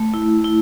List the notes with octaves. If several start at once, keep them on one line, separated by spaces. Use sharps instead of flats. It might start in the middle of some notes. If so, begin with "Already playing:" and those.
Already playing: A3
E4
E4